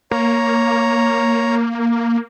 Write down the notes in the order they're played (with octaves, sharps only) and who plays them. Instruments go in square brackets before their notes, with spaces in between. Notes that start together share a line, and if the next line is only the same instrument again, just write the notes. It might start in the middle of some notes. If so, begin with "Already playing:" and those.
[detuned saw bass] A#3 [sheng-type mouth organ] C#5 A#5